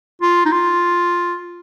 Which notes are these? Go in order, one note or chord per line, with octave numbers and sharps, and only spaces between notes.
F4
D#4
F4